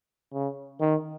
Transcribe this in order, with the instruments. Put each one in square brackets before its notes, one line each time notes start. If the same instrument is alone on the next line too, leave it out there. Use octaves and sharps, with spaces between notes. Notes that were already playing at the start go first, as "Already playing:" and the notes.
[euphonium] C#3
D#3